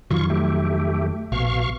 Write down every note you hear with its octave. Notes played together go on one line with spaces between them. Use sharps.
F2 D#3 F#3 F4 C#6
A3 G4
A#1 B2 F5 C#6